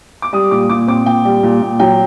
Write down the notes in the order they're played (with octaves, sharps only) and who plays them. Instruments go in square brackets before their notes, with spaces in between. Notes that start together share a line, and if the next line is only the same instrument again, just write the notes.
[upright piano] D6
G3 D#6
A#2 D6
A#2 D6
C4 D6
A#2 G5
G3
A#2
A#2
F#3 G5